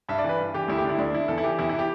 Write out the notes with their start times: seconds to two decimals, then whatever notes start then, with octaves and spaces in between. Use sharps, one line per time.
0.09 G2 E5
0.18 D5
0.24 E3 B4
0.39 G2
0.54 E3 G4
0.68 D2 E4
0.78 G4
0.84 D3
0.89 E4
0.98 D2 D4
1.13 D3 E4
1.28 E2 A4
1.38 E4
1.44 E3 G4
1.58 E2 E4
1.69 E3 E4
1.79 G4